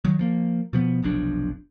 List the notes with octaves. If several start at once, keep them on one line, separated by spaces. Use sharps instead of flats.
D#3 F#3
F3 A#3
B2 F3 B3
F1 B1 F2 D4